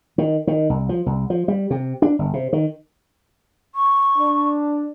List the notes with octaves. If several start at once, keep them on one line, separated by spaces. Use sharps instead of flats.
D#3
D#3
C2
F3
C2
F3
G3
C3
D4
G1
C3
D#3
C#6
D4